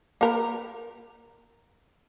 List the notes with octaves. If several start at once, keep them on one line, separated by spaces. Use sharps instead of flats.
A#3 A#4 B4